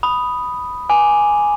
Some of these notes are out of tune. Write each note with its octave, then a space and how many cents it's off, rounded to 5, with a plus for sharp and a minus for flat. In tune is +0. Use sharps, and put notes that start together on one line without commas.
B5 +0 D#6 +0
G#5 +0 D6 +0